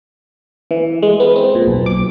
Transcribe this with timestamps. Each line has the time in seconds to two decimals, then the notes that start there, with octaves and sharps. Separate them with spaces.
0.71 E3
1.03 G#3
1.20 B3
1.36 C4
1.55 A#2
1.67 B1
1.86 D6